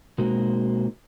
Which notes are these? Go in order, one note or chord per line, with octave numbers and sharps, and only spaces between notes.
B2 G#3 A#3 C4 D#4 F#4